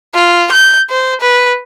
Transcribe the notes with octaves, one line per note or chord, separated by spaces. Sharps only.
F4
G6
C5
B4